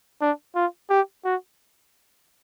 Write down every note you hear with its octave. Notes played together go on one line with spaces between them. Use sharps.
D4
F4
G4
F#4